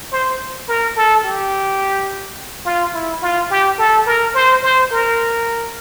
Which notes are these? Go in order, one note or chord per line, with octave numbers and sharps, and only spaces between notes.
C5
A#4
A4
G4
F4
E4
F4
G4
A4
A#4
C5
C5
A#4